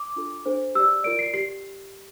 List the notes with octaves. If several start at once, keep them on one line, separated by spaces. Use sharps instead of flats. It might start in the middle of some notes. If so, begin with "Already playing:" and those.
Already playing: D6
D4 F4 A4
D4 A4 C5
G4 D5 E6
F4 A#4 D5 D7
C7
G4 C7